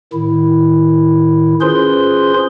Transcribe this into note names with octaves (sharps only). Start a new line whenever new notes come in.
A2 D#3 E4
C#4 F4 G#4 B4 C5 C6